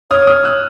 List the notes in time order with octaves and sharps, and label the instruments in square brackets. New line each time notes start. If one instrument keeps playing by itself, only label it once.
[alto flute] C#5 [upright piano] D#6 F6
[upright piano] D#6 F6
E6 F#6